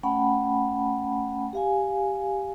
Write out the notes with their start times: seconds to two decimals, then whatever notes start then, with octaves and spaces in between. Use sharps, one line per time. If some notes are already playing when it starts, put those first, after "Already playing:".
0.03 A3 C#4 F#5 G5 A5 B5
1.53 G4 F5 G#5